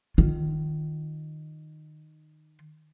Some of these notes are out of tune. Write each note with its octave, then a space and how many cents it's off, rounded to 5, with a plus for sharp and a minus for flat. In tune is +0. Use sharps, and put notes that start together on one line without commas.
D#3 -15 F4 +0